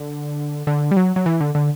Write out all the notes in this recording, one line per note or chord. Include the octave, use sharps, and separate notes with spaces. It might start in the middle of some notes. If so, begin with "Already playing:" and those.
Already playing: D3
D3
G3
F#3
F#3
E3
D3
D3